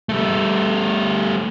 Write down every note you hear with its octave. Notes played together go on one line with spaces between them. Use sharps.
G3 A3